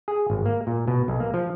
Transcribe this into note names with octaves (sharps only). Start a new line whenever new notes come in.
G#4
G#1
A#3
A#2
B2
B1
A#3
F3